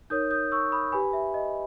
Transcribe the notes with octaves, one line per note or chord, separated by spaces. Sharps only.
D#4 A#4 C#5 D#6 G6
D#6 G6
C#6 E6
B5 D#6
G4 B4 G#5 B5
E5
D#5